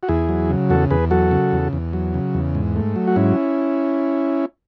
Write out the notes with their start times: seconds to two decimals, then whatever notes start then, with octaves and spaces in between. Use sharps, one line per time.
0.03 F#4
0.08 E2 E4 G#4
0.29 F#3
0.50 C#3
0.70 E2 F#4 A4
0.91 E2 G#4 B4
1.11 F#3 F#4 A4
1.31 C#3
1.52 E2
1.73 E2
1.93 F#3
2.14 C#3
2.34 E2
2.55 G#2
2.76 A3
2.96 F#3
3.08 F#4
3.16 G#2 C#4 E4